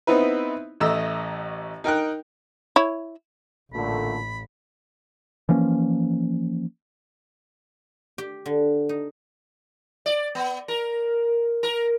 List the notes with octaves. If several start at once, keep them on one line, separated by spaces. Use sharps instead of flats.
B3 C4 D#4 E4 B4
A1 A3 D#5 A#5 E6
D#4 A#4 G5 F#6
E4 C#5
A1 A#2 D3 A3 B5
E3 F3 A#3 C#4
G4
D3
D#4
D5
B3
A#4
A#4